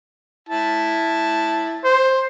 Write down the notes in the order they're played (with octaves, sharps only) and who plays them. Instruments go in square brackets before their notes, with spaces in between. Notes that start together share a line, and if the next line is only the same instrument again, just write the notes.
[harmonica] E4 A5
[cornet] C5